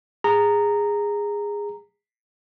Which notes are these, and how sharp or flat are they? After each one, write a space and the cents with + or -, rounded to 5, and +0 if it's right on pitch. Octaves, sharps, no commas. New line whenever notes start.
G#4 -15 A#5 -10